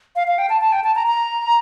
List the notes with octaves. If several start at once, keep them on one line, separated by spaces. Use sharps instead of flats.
F5
F5
G5
A5
A5
G5
A5
A#5
A#5